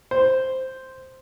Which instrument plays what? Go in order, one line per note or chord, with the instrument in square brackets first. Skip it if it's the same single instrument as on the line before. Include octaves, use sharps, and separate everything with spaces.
[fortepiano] C5